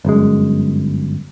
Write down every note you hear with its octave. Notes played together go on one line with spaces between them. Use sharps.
G1 F#2 G#3